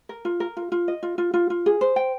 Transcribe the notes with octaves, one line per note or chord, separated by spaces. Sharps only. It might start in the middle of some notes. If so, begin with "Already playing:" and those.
A#4
F4
A#4
F4
F4
D#5
F4
F4
F4
F4
G#4
C5
G5